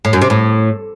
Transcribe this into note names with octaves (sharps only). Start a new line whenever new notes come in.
A2
F#2
C3
A2